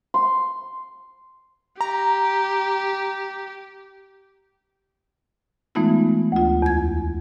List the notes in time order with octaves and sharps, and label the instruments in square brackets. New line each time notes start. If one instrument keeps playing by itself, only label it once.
[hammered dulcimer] C6
[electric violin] G4 [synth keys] A#5
[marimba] E3 G#3 A3 B3 D#4 F4
D2 F4
E2 G#6